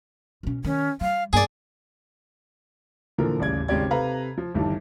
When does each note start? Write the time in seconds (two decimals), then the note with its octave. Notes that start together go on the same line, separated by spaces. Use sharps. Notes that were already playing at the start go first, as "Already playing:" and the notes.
0.43 B2 C#4
0.65 D#3 C#4
1.01 G3 F5
1.33 G2 A#3 G#4 D5
3.18 A#2 D3 E3 F3 A#4
3.39 D#1 A1 C#3 D5 G#6
3.68 G#1 C#3 C4 G4 D5 G#6
3.90 C3 A4 B4 F5 A#5
4.38 F3
4.54 G1 G2 D#3 E3 G3 A5